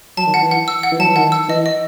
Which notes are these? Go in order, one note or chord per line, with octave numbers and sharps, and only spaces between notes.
F#3 A5
D#3
F#5
E3
F#5
E6
F#5
E3
F#3 A5
E3
D#3 F#5
E6
E3 D#5
D#5